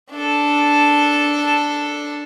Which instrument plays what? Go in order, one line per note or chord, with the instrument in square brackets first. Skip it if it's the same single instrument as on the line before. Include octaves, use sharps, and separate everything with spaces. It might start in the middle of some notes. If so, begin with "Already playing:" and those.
[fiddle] D4 A4